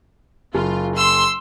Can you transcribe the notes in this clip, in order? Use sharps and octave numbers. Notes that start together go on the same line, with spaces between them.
F#1 F4
C6 E6